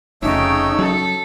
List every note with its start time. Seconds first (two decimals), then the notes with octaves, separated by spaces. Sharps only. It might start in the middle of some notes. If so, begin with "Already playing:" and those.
0.23 F1 C#3 A3 D#4 C#5 G5 E6
0.79 F#3 C#4 A4